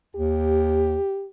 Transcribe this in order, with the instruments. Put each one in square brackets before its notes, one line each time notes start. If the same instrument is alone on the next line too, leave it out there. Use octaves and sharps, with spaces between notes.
[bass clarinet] D#2 [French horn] G4